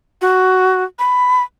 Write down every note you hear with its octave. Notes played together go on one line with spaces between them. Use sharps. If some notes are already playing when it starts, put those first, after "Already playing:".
F#4
B5